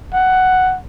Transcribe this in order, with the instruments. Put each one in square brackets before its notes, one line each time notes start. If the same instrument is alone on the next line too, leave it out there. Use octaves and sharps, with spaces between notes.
[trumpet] F#5